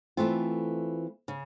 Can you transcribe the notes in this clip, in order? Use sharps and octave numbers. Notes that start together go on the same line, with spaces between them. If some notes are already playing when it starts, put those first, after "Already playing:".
E3 A3 C4 F4
C#3